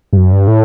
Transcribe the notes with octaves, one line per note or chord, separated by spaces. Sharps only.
G2
F#2
G2
A2